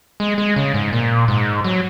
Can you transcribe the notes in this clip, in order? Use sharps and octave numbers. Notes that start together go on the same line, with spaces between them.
G#3
G#3
C#3
G#2
A#2
G#2
F#3